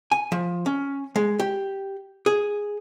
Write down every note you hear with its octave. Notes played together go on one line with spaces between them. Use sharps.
G#5
F3
C#4
G#3
G4
G#4